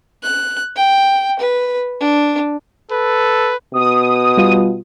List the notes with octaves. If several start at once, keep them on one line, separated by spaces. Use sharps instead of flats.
F#6
G5
B4
D4
A4 B4
B2 D#6
G3 F4